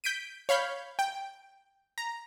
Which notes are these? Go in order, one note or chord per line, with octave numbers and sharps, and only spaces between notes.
G6 B6 D7 D#7
C#5 F5 B5 G6
G5
A#5